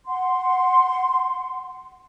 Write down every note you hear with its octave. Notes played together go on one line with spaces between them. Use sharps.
F#5 C6